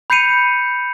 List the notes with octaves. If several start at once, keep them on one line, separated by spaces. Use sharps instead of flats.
B5 G6 C7 C#7 D#7 F7